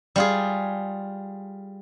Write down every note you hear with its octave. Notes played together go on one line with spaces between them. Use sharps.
G3 F4 G#4